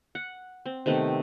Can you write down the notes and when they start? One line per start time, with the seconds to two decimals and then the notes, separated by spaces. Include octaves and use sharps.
0.15 F#5
0.66 C4
0.86 C3 D#3 A3 B3